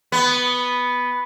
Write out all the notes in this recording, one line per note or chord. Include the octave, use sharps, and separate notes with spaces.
B3